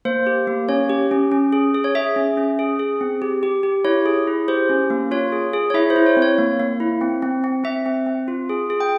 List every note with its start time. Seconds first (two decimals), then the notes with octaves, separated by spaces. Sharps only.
0.05 A#3 C5
0.27 G4
0.47 A#3
0.69 C#4 C#5
0.90 G4
1.11 C#4
1.32 C#4
1.53 G#4
1.74 G#4
1.84 C#5
1.95 G#4 E5
2.16 C#4
2.37 C#4
2.59 G#4
2.79 G#4
3.01 C4
3.22 G4
3.43 G4
3.63 G4
3.85 E4 C#5
4.06 G#4
4.27 E4
4.48 G4 C5
4.69 C#4
4.90 A#3
5.11 F4 C#5
5.32 G#4
5.53 G#4
5.70 C#5
5.74 E4 E5
5.90 C5
5.96 E4
6.06 C#5
6.17 C4
6.22 C#5
6.38 A#3
6.60 A#3
6.80 E4
7.01 C4
7.22 C4
7.44 C4
7.64 C4 E5
7.86 C4
8.06 C4
8.28 F4
8.49 G#4
8.70 G#4
8.80 G5